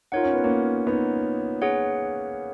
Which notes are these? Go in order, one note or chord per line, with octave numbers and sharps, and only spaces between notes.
D#4 F4 A#4 C#5 F#5
C#4
B3
A#3 C#4
B3 D#4
G#4 C#5 F#5